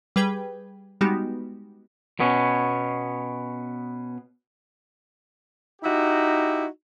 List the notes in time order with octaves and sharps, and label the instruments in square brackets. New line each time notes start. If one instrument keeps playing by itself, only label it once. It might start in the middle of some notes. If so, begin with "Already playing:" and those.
[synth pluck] G3 G#4 B4 G5 G#6
G3 G#3 B3 D#4 F#4 G4
[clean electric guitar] B2 B3 C#4
[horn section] D#4 E4 F#4 G4